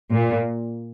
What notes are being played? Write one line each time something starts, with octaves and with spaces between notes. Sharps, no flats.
A#2